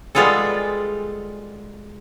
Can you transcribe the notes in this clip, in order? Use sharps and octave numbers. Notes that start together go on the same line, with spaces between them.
G3 G#3 B3 F4 G#4 A4